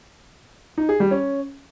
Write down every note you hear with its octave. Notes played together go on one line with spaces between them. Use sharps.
D#4
G#4
G3
C#4